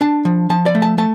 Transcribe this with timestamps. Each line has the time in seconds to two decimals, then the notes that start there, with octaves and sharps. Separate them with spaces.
0.01 D4 A5
0.25 F3
0.50 F3 A5
0.66 D5
0.75 A3
0.82 A5
0.98 A3 A5